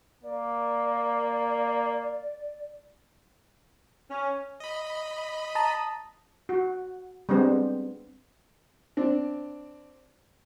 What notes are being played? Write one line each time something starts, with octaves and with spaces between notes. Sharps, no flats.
A#3 D5
C#4
D#5 B5
A5 A#5 D#6
F#4
G3 G#3 B3 C4 D4
C4 D4